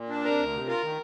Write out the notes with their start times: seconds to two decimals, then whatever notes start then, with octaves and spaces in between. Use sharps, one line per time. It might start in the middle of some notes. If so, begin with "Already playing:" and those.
Already playing: A#2
0.09 D4
0.24 C3 A#4
0.38 D2
0.53 C3
0.67 F4 A#4
0.82 D#3